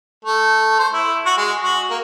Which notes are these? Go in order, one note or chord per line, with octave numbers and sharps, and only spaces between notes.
A3
C5
E4
F#4
G#3
F#4
A#3